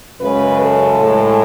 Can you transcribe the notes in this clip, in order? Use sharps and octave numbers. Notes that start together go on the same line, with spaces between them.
F#2 C#3 G#3 B4
A4
A2 G#3